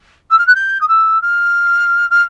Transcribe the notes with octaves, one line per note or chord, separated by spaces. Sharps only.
E6
F6
F#6
G6
D#6
E6
F6
F6